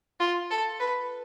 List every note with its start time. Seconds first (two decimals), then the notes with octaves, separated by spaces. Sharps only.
0.20 F4
0.50 A4
0.80 B4